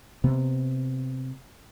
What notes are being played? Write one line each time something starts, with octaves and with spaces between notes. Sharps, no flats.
C3 B3